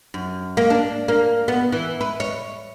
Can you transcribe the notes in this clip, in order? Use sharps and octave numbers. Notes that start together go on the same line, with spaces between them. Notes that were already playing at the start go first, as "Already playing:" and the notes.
F#2
A#3
D4
A#3
B3
E3
B4
C#5